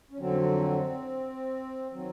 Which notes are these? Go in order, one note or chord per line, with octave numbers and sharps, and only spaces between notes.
C#4
F2 D3 F#3 C4
D#3 F#3 C4